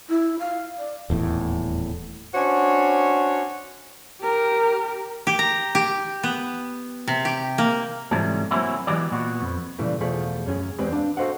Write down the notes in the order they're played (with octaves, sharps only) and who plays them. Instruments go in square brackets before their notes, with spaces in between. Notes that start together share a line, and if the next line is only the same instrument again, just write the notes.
[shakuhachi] E4
F5
D5
[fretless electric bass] D#1 E2 A2
[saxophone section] C#4 D4 F#4 C5 C#5
[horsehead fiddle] G4 A#4
[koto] G4
A#5
G4
B3
C3
G4
A#3
[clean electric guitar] G#2 C3 E3 F#3 G3 A3
F#3 A#3 C4 C#4 E4 F#4
E3 F#3 G#3 B3 G4 D5
A#2 B3 F#4
F2
[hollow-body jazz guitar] A#2 C#3 E3 G3 A3
E2 B2 F3 A3 G#4 B5
F#2 C#4 G#4
E2 G#3 C4 G4 B4 B5
D4 F5
F#4 A4 C5 D#5 F5 F#5